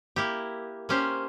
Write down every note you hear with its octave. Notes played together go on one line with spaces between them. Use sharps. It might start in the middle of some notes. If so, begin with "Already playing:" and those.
A#3 E4 G4
A#3 C#4 G4 C5